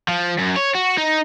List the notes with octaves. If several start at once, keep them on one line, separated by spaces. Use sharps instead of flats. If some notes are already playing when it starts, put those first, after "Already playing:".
F3
F#2
C#5
F#4
D#4